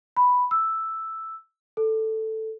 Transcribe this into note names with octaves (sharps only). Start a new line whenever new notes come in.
B5
E6
A4